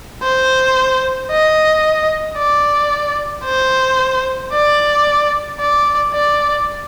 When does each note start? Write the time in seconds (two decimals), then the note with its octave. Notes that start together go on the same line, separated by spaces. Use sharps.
0.23 C5
1.31 D#5
2.37 D5
3.45 C5
4.53 D5
5.60 D5
6.14 D5